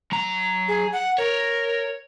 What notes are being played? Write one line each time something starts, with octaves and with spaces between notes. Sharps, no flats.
F#3 A#5
G#4
F#5
A#4 C#5